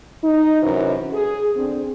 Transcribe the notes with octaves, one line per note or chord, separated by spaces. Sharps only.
D#4
F#2 C3 E3
G#4
D3 C4